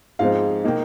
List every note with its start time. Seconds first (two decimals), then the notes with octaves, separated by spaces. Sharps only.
0.19 G#2 F3 G#3 C4 F5
0.64 D#3 A#3 D#4